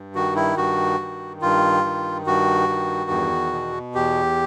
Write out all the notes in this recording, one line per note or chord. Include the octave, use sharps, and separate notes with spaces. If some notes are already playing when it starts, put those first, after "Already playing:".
Already playing: G2
D#3 F#4
E4
G2 F#4
D#3
G2 F4
D#3
G2 F#4
D#3
E2
B2
E2 G4